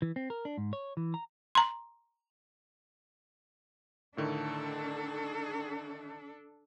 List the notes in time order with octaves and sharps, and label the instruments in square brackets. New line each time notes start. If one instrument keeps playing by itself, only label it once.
[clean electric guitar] E3
C4
A#4
D4
G#2
C#5
E3
A#5
[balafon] A#5 C6
[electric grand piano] A2 D3 D#3 [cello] D4 A4